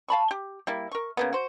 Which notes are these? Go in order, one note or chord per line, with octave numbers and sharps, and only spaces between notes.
F5 A5 B5 C#6
G4
G3 A#3 E4
A#4 C#6
C#3 A#3 B3
F#4 C5